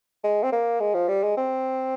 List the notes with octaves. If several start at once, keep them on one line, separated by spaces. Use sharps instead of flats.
G#3
C4
A#3
G#3
F3
G3
G#3
C4